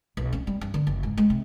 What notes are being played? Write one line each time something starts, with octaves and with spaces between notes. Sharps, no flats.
B1
C#4
G3
G2
D3
F#1
G#2
G#3
C3